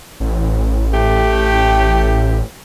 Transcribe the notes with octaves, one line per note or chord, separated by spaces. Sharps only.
A1
A3 G4